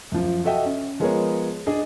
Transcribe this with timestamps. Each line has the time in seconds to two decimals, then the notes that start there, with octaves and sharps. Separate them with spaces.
0.12 F#2 F3
0.44 F#4 A4 D#5 E5 G5
0.66 C#4
1.00 F3 G#3 B3 G#4 A#4 C#5
1.67 D4 G#4 D#5